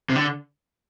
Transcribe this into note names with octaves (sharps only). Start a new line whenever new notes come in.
C3
D3